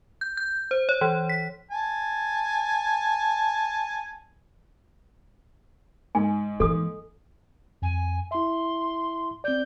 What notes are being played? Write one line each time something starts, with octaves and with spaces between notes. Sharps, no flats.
G6
G6
C5
C#5
E3
B6
G#5 A5
G#2 G#5
E3 A#3 A4 D#6
F2 G#5
E4 E5 C6
C4 D5 G6